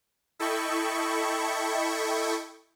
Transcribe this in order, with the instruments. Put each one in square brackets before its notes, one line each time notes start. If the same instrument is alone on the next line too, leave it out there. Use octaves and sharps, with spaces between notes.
[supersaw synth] E4 A4 D#5 G5 B5 C#6